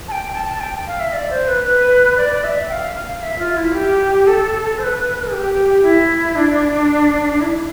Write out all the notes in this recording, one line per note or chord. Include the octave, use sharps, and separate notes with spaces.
A5
G5
A5
G5
F5
E5
D5
C5
B4
B4
D5
D5
E5
G5
F5
F5
E5
F4
E4
G4
A4
C5
B4
G4
E4
D4
E4